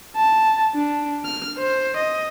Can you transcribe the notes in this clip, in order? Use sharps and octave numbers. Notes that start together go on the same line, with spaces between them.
A5
D4
F6
C5
D#5